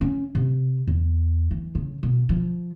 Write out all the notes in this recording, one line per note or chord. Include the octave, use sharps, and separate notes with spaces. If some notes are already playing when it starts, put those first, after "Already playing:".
C#4
C3
E2
E3
C#3
B2
F3